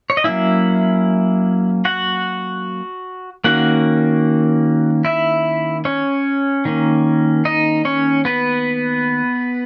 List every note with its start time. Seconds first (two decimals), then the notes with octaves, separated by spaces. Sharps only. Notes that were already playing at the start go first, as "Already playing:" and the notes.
0.10 C#5
0.17 D#5
0.24 F#3 A#3 C#4 E4 E5
1.85 F#4 F#5
3.44 D#3 A#3 C#4 F#4 F#5
5.05 E4 E5
5.85 C#4 C#5
6.65 D#3 A#3 C#4
7.45 D#4 D#5
7.85 C#4 C#5
8.25 B3 B4